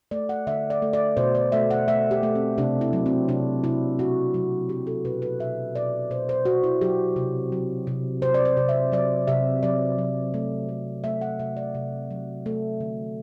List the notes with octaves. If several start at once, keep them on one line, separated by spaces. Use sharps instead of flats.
A3 D5
F#5
D3 E5
D5
A3
D5
B2 C5
D5
A3 E5
F#5
A3 E5
G4
A3
C4
C3 D4
E4
F#3
C4
C3 D4
C3 E4
B2 F#4
F#3
F#3 G4
A4
B2 B4
B4
B2 E5
B2 D5
B2 C5
C5
B2 F#4
E4
F#3 G4
C3
F#3
C3
C3 C5
D5
C5
C3
E5
F#3 D5
C3 E5
F#3 D5
F#3
A3
A3
A3 E5
F#5
C3 E5
D5
C3
F#3
A3
D3